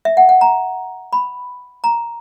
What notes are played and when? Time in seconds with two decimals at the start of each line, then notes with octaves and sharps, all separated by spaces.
0.05 E5
0.17 F#5
0.29 F#5
0.41 A#5
1.13 B5
1.84 A#5